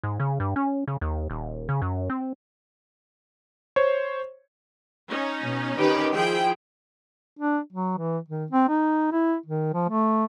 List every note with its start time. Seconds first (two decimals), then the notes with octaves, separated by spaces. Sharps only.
0.03 G#2
0.20 C#3
0.40 G2
0.56 C#4
0.88 C#3
1.01 D#2
1.30 D#1
1.69 C#3
1.82 F#2
2.10 C4
3.76 C5 C#5
5.10 C#4 D#4
5.42 B2
5.78 D#3 G4 B4
6.14 F3 E4 G#4 G5
7.39 D4
7.72 F#3
7.97 E3
8.28 D#3
8.50 C4
8.68 D#4
9.12 E4
9.46 D#3
9.73 F3
9.89 A3